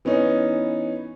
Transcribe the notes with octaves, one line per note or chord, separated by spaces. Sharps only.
E3 B3 C#4 D#4